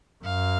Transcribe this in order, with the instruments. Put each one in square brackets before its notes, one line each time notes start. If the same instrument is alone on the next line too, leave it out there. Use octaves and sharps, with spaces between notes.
[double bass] F#2 [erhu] F5